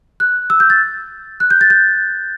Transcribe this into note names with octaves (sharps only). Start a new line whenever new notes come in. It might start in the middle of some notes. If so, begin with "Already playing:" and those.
F#6
E6
G6
A6
F#6
G6
A6
G6